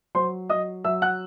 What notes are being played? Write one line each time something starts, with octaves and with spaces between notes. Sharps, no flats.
F#3 C5 C6
F#3 D#5 D#6
F#3 E5 E6
F#5 F#6